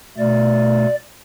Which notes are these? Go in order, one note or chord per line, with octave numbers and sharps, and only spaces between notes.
B2 A3 D5